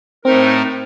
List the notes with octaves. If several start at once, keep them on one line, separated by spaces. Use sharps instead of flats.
A2 A3 C4 D#4 A#4